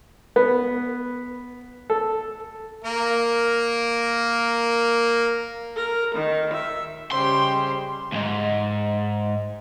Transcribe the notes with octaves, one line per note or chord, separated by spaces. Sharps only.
B3
A4
A#3 A#4
A#4
D#3
E5
C#3 G3 G#3 C5 G5 C6
C#2 G#2